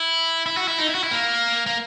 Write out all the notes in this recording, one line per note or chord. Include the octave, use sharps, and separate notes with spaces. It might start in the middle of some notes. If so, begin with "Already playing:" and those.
Already playing: E4
E4
F#4
E4
D#4
E4
F#4
E4
A#3
A#3